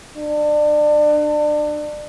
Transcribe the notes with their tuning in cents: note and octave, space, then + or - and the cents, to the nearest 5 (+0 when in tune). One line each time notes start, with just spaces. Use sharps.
D4 +30